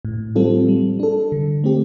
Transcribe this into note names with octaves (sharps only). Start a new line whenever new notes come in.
A2
G3 C4 F4 A4
G3
D4 A4
D3
A3 C4 G4